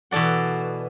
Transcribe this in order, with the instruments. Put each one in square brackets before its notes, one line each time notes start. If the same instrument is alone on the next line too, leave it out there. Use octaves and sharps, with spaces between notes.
[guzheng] B2 E3 A4 D5 F#5